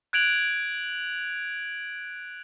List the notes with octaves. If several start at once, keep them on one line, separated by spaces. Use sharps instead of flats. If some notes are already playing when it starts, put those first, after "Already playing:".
F#6 G#6 D7 F7 F#7